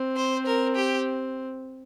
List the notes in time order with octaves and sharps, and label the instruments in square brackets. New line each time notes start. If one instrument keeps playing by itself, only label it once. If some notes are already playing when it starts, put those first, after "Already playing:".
Already playing: [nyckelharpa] C4
[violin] C5
A#4
G4